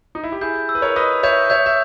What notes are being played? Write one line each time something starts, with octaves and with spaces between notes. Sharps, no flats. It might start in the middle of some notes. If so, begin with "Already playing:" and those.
D#4
E4
G4
E4 G#4 G6
E6
B4
A#4 C#5
B4 D#5 D#6
C#5 E5 G6
C#5 E5 G6
E5